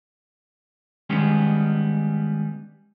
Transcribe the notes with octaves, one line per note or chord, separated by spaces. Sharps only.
D#3 G3 G#3 B3 C#4